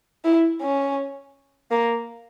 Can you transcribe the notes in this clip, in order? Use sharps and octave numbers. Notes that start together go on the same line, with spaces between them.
E4
C#4
A#3